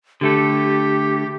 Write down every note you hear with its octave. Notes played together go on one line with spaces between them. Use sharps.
D3 A3 G4 A4